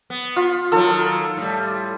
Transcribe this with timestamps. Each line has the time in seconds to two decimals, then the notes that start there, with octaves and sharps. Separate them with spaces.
0.10 B3
0.36 F4
0.72 D#3 F#3 A4
1.37 A2 G3